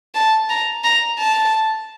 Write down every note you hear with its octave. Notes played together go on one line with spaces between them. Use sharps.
A5
A#5
A#5
A5